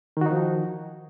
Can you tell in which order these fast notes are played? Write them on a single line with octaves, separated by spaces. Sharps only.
D#3 F#4 D#4 F3